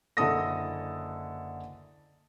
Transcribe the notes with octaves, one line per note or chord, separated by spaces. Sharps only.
F#1 D3 E4 A4 D#6 A#6